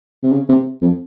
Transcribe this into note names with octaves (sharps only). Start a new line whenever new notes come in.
C3
C#3
C3
F2